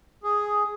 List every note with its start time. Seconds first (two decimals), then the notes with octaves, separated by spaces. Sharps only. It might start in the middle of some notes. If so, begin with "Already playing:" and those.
0.24 G#4